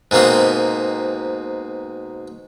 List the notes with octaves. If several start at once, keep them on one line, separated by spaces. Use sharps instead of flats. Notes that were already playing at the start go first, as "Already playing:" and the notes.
G#2 B2 A#3 C4